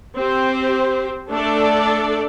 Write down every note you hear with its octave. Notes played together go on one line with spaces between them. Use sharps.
C4 G4 C5
A3 D4 A4 D5